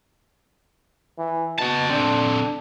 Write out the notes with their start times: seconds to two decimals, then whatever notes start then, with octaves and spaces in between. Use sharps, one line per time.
1.18 E3
1.59 B2 F#4 A5
1.90 D3 C4 D4